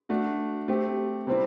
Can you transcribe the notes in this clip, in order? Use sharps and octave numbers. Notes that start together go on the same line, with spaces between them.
A3 D4 F#4
A3 C4 G4
C3 G3 C4 E4